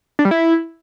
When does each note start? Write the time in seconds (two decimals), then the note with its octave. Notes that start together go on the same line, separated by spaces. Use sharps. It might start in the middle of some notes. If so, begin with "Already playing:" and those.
0.19 D4
0.25 G3
0.31 E4